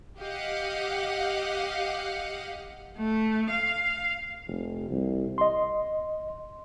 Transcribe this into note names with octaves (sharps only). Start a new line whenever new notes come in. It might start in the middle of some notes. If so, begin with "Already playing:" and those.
G4 D#5 F5 F#5
A3
F5
F1
C2
D#5 C6